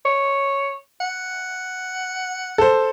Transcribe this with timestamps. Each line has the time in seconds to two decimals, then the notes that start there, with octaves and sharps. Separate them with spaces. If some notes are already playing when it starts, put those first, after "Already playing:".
0.05 C#5
1.00 F#5
2.58 A4 C5